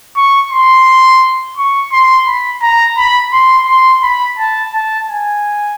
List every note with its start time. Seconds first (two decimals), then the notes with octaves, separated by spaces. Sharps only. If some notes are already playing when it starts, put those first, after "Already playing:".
0.16 C#6
0.52 C6
1.57 C#6
1.92 C6
2.27 B5
2.62 A#5
2.97 B5
3.33 C6
3.68 C6
4.03 B5
4.39 A5
4.74 A5
5.09 G#5